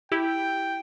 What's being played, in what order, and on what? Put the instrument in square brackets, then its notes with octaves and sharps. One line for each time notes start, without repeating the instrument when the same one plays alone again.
[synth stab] E4 G4 [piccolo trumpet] G5